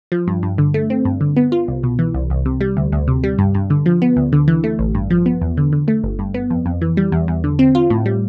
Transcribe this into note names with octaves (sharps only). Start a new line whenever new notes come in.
F3
G2
G2
D3
A3
C4
G2
D3
B3
F4
C2
B2
E3
C2
C2
C3
G3
D2
D2
C3
G3
G2
G2
D3
F3
B3
D2
D3
E3
A3
A1
G2
F3
B3
E2
D3
D3
A3
G1
G2
B3
F2
F2
E3
G3
E2
E2
D3
C4
F4
A2
G3